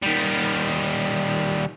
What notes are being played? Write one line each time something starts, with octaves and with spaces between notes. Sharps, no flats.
D#3 G3